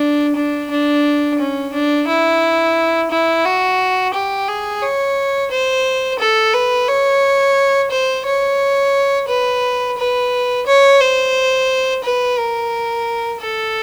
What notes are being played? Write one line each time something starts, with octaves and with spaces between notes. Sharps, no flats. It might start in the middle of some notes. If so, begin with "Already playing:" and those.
Already playing: D4
D4
D4
C#4
D4
E4
E4
F#4
G4
G#4
C#5
C5
A4
B4
C#5
C5
C#5
B4
B4
C#5
C5
B4
A#4
A4